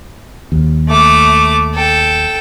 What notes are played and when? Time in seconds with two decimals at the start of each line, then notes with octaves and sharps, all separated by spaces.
0.52 D#2
0.88 A3 D6
1.75 A4 G5